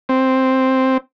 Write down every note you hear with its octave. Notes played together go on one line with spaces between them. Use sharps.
C4